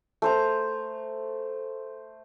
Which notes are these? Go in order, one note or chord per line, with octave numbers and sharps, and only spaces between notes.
A3 C5 A#5